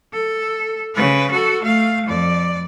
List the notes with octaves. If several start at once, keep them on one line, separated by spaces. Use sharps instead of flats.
A4
C#3 B4
F#4 A4
A3 F5
F2 D5